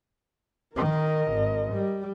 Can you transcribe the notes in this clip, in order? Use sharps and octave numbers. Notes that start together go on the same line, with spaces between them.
D#3 A#4 D#5
G#1
G3